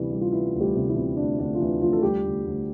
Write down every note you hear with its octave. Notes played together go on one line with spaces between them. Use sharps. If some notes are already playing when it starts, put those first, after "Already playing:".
Already playing: D2 C3 E3 G3
G3
F4
E3 E4
D2
G3 G4
C3
E3 E4
C3
D2 D4
D2 D4
F4
D2 E3 E4
D2 F3 F4
A4
D2 G3 G4
D2
D2